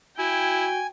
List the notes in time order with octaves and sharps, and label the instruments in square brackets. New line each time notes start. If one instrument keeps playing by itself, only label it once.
[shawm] E4 [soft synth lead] F#4 [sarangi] G5 [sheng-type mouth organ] G#5